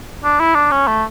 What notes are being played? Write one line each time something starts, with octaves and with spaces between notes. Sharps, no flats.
D4
E4
D4
C#4
A3